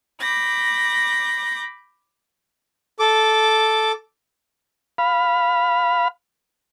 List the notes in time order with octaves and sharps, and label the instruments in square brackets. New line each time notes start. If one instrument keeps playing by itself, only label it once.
[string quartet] B5 D6 G6 A#6
[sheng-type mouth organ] A4 D6
[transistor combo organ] F5 B5